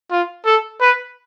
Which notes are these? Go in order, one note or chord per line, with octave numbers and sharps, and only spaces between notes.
F4
A4
B4